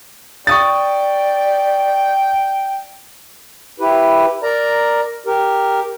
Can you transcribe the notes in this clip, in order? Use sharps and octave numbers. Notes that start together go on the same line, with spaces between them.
D5 G5 C#6 D#6 A6
E4 G4 B4
A#4 D5 A#5
G4 A#4